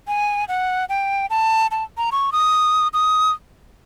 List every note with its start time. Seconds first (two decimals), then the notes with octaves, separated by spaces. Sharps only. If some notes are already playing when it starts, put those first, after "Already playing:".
0.08 G#5
0.48 F#5
0.89 G5
1.30 A5
1.71 A5
1.98 A#5
2.12 C#6
2.32 D#6
2.94 D#6